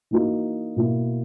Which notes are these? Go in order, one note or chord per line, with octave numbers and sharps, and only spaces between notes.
E3 A#3 D#4 F#4
B2 A#3 E4